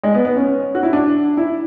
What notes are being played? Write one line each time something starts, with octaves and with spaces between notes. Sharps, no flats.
G#3
B3
B3
C#4
F#4
E4
D4
E4